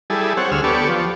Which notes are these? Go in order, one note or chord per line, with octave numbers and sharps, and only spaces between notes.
G3 E4 G#4 A4
C4 C#5 F#5
D2 G#4 E6 F6
B3 G4 A4 D5 C#6
F3